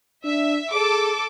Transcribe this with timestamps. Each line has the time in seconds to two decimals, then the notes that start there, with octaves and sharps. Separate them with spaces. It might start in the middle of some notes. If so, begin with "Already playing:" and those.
0.24 D4 E5
0.72 G#4 A4 D6